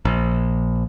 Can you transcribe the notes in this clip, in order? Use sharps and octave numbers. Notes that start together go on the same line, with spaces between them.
A#1